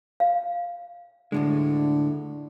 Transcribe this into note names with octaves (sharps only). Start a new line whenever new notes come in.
F5
D2 A2 D3 G#3